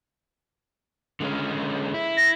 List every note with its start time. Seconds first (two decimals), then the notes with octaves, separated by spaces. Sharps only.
1.20 D3 G#3 C#4
1.94 E4
2.17 A#6